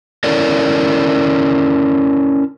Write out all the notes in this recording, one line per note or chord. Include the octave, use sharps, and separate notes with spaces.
C#4 E4 A4 A#4 C#5 D5